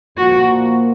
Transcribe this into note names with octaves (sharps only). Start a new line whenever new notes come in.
A#2 F3 A#3 F#4